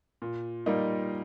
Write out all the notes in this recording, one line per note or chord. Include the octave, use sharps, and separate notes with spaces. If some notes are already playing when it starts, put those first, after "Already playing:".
A#2
G3 A#3 D#4